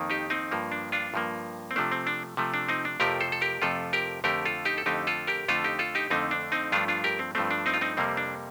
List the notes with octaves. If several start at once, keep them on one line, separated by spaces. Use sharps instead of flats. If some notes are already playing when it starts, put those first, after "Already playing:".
Already playing: F2 D#3 A#3
D#4 G4
C4 D#4
G2 F3 A#3
D4
D4 F4
G2 F3 A#3
C4
C3 F3 A3 D4
C4
D4
C3 F3 A3
D4
C4 D#4
D4
F2 C3 F3 A3 G4 A#4
A4 C5
A4
G4 A#4
F2 C3 F3 A3 F4 A4
G4 A#4
F2 D3 A3 G4 A#4
F4 A4
D#4 G4
A4
F2 D3 A3 D#4 G4
F4 A4
G4 A#4
F2 D3 A3 F4 A4
D#4 G4
F4 A4
D#4 G4
F2 D3 A3 C4 D#4
D4
C4 D#4
G2 F3 A3 D4 F4
D4 F4
G4 A#4
C4
G2 F3 A3 C4
D4
C4 D#4
F4
C4 D#4
F2 C3 G3 A#3 C4
D4